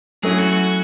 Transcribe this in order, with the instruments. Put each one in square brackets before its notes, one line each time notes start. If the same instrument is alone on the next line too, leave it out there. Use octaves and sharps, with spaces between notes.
[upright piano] F#3 A3 C#4 E4 [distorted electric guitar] G#4
[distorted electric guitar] F#4
F#4